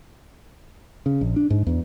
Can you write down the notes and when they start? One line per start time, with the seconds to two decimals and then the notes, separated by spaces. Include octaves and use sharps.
1.06 C#3
1.21 A#1
1.36 D4
1.50 G#2
1.67 E2